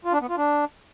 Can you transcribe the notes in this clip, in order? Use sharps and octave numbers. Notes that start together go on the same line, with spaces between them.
F4
D4
B3
F4
D4